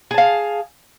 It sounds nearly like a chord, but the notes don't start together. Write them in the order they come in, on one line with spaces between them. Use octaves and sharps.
G#4 A5 F5